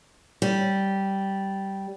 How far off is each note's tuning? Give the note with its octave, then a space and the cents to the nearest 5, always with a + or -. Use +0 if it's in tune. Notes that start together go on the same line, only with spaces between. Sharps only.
G3 -10